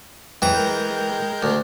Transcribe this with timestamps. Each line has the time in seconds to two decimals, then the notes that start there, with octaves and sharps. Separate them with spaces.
0.42 F2 E3 F#3 G#3 G5 A#5
0.55 G#3 A#4 G6
1.43 D2